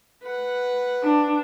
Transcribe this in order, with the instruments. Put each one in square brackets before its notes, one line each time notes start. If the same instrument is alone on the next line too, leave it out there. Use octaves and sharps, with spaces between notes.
[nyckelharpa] B4 F#5
[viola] D4